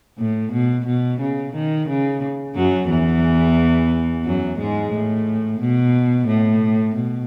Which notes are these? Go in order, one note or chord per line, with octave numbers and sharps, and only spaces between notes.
A2
B2
B2
C#3
D#3
C#3
F#2 F#3
E2 E3
F#2 F#3
G#2 G#3
A2
B2
A2
B2